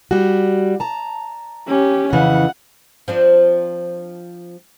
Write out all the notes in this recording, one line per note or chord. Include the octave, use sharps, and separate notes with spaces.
G3 F#4
A5 A#5
C#4 G4
F2 C#3 E3 F#5
F3 C4 D4